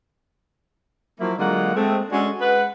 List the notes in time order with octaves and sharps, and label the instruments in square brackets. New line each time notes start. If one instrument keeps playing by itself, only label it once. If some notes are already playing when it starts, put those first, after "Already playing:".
[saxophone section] F3 F#3 A#3 E4
D3 F#3 G#3 A#3 F4 F#5
G#3 A3 C4
G#3 C#4 D4 F#4 G#4 A4
G#3 B4 F#5